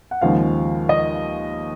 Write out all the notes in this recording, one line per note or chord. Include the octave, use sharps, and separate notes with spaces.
F#5
D#2 C#3 F3 G#3 F5
D#5